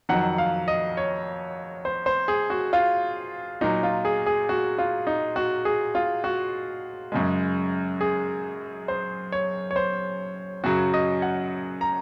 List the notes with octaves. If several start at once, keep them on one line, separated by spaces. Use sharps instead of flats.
F2 D#3 F#3 F#5
F5
D#5
C#5
C5
C5
G#4
F#4
F4
A#2 F#3 D#4
F4
G#4
G#4
F#4
F4
D#4
F#4
G#4
F4
F#4
F#2 C#3 G#3
G#4
C5
C#5
C#5
C5
F#2 C#3 F#3 F#4
D#5
F#5
A#5